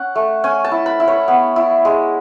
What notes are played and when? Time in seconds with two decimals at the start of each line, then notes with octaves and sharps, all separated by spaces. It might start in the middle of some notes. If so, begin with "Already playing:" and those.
Already playing: C#4 F#5
0.15 A3
0.44 C#4 G#5
0.64 A5
0.72 E4
0.86 B5
1.00 E4
1.08 C#5
1.28 B3
1.56 E4
1.85 G#3